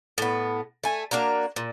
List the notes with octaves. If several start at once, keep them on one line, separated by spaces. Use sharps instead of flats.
A2 B3
A3 G#5
A#3 D4 F#4 A#5
A#2